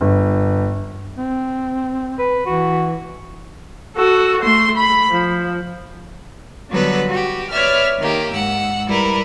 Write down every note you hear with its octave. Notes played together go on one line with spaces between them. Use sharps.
G1
C4
B4
E3 F#4
F#4 A4
A3 C6
B5
F3
D3 F#3 G3 B3 A4 B4
F#4 G4
B4 C#5 D5 E5 F6
D#3 A#3 G4
G#2 F#5 E6
G3 E4 A#4 B4